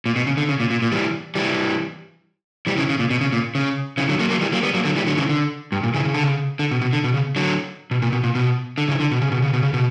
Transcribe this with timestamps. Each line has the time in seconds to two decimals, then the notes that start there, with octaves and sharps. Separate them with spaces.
0.06 A#2
0.16 B2
0.27 C#3
0.37 D3
0.49 C#3
0.60 A#2
0.70 A#2
0.82 A#2
0.92 E3 G3
1.35 E3 G3
2.67 E3 G3
2.78 C#3 E3
2.89 C#3
2.99 A#2
3.10 B2
3.21 C#3
3.33 A#2
3.55 C#3
3.98 C#3 E3
4.09 D3 F#3
4.20 F#3 A#3
4.30 F#3 A#3
4.41 E3 G3
4.53 F#3 A#3
4.63 G3 B3
4.74 F#3 A#3
4.85 D3 F#3
4.96 E3 G3
5.07 D3 F#3
5.17 C#3 E3
5.29 D3
5.72 G2
5.83 A#2
5.94 C#3 E3
6.05 C#3
6.14 D3
6.23 C#3
6.59 D3
6.71 B2
6.81 B2
6.93 D3
7.04 B2
7.14 C#3
7.36 D3 F#3
7.91 B2
8.02 A#2
8.12 B2
8.23 A#2
8.35 B2
8.78 D3
8.88 C#3 E3
9.00 D3
9.11 B2
9.22 C#3
9.32 B2
9.42 C#3
9.53 B2
9.63 C#3
9.74 B2